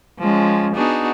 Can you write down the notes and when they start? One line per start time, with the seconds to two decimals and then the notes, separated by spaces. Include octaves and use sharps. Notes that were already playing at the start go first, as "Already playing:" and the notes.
0.19 F3 G#3 C#4
0.76 B3 D4 D#4 F#4 G#4